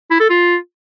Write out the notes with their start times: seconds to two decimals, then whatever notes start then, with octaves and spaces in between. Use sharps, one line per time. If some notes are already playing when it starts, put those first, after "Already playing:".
0.11 E4
0.20 A4
0.30 F4